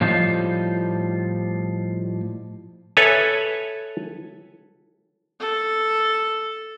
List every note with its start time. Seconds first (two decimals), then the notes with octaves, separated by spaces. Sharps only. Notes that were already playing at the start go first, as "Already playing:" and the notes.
0.01 A2 F3 G3 D#4 F4
2.97 A4 B4 C#5 E5 G#5 A5
5.40 A4